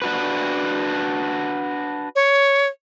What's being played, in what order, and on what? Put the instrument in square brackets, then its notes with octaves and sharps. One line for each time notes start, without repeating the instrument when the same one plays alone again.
[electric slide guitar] D4 F#4 B4
[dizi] C#5